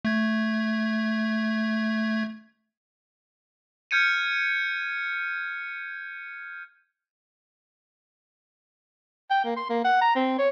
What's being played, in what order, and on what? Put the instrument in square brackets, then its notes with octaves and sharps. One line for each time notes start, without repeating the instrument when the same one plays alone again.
[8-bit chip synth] A3 G#6
[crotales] F6 G6 G#6 C#7 D#7
[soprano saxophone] G5
A#3
C6
A#3
F#5
A#5
C4
C#5